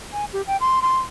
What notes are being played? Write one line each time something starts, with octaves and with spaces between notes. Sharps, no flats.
G#5
G4
G5
C6
C6